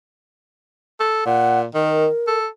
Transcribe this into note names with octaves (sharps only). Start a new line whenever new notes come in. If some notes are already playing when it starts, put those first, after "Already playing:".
A4
A#2 F#5
D#3 A#4
A4